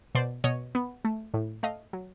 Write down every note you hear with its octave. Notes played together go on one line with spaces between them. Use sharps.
B2 C5 D5
B2 C#5 D#5
B3
A3
A2
A3 D#5 F5
F#3